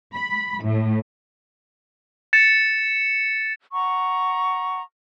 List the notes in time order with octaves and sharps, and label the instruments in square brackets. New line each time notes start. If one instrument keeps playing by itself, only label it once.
[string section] B5
A2
[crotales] A6 C#7 E7
[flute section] F#5 A#5 C#6